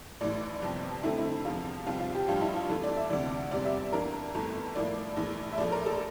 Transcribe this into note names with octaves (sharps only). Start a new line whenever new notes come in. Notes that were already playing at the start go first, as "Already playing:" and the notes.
A1 A2 E3 D5
G1 F2 C3 F3 C4
F2 D3 A3 C4 E4
E4
E2 C3 F3 F4
C2 C3 F3 C4 F4
F4
G4
A1 G2 F3 F4
E4
F4
F2 E3 A3
D5
E5
D2 C3 E3 D5
F1 E2 C3 G3 D5
E5
F2 E3 A#3 D4 A#4
G1 F2 E3 A3
A2 F3 A#3 E4 D5
A#1 A2 E3
E5
A#1 A2 F3 A3 D5
A#4
A4